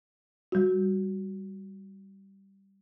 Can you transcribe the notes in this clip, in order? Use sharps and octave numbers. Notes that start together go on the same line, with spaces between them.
G3 F#4